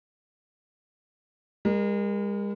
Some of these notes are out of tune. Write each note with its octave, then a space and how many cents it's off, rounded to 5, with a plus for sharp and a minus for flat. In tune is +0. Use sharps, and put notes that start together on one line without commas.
G#3 -40 A#4 +10